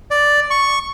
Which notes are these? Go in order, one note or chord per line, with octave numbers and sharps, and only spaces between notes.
D5
C#6